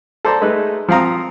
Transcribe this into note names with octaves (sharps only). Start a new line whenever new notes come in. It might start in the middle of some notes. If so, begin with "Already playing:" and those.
A4 C5 D5 A5 A#5
G#3 A3 D#4 B4
F3 C4 F5 A#5 D#6